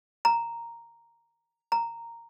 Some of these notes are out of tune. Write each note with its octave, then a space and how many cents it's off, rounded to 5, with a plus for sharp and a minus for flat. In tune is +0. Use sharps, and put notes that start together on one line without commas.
A#5 -5
A#5 -10